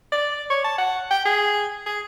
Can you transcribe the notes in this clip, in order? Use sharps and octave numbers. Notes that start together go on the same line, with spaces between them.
D5
C#5
A5
F#5
G5
G#4
G#4